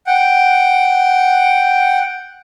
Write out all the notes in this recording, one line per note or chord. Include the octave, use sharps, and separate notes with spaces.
F#5 G5